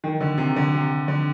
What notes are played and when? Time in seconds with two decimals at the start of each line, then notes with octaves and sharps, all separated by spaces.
0.04 D#3
0.20 D3
0.38 C3
0.56 D3
0.74 C3
1.08 D3